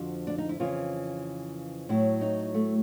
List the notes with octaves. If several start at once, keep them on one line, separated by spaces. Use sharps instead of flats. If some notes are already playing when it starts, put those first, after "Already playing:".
Already playing: F2 D3 F3 F#4
D4
D#4
E4
F2 C#3 E3 F4
A2 F#3 E4
D#4
A3